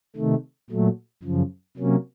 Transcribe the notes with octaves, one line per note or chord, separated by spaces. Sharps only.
C3 D#3 A3
A#2 F#3 A3
F#2 C#3 F3
C3 F#3 A#3 C#4